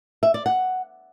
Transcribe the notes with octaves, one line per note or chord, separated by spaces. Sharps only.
E5
D5
F#5